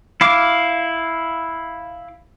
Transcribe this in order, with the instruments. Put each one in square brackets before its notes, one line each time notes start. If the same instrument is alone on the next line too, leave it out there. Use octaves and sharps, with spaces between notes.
[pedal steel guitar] E4 F5 D6